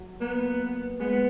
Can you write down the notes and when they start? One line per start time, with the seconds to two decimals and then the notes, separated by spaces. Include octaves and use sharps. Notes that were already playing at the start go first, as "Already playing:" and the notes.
Already playing: F#3
0.20 A#3 B3
1.00 G#3 B3